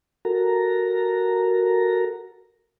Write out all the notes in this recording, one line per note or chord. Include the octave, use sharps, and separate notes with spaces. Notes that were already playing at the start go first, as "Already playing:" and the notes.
F#4 A4 A#4 A#5